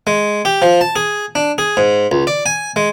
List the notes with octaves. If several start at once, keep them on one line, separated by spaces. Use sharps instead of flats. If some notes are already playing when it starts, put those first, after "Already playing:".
G#3
G4
F3
A5
G#4
D4
G#4
G#2
C#2
D5
G#5
G#3